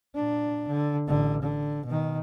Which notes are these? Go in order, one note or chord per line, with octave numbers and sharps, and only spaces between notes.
A#2 D4
D3
A1 D3
D3
B2 D#3